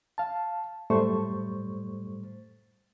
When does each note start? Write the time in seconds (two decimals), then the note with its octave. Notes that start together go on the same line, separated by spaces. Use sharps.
0.18 F5 A5
0.90 F#2 A2 G3 A3 C5 C#6